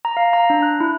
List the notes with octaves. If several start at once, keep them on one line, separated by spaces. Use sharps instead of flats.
A#5
F5
A#5
D4
F#6
E4